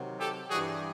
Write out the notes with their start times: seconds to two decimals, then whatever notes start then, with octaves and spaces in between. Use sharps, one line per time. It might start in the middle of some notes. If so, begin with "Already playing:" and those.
Already playing: C3 D#3 F#3
0.20 G4 A4
0.50 G2 E3 G3 F#4 G#4